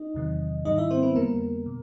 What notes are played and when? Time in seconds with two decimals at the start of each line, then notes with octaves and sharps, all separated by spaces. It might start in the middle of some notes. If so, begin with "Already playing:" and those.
Already playing: D#4 D#5
0.15 E2 C3 D#3 F#3
0.65 G#2 D#3 G3 D#4 D#5
0.78 E4 E5
0.91 C4 C5
1.03 B3 B4
1.15 F2 D3 G3 A#3 B3 A#4
1.66 B2